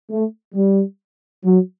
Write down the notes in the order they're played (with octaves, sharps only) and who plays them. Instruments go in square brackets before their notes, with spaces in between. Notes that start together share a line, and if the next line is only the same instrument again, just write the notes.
[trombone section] A3
G3
F#3